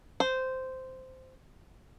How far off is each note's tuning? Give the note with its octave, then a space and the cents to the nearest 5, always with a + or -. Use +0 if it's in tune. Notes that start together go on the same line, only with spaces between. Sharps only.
C5 -10